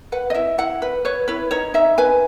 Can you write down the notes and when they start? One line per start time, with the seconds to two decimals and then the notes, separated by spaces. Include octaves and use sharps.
0.12 B4 F#5
0.30 D#5
0.34 E4 E5
0.58 E4 F#5
0.82 B4
1.05 B4 C#5
1.28 E4 B4
1.51 D#4 C#5
1.74 D#4 E5
1.98 B4 G#5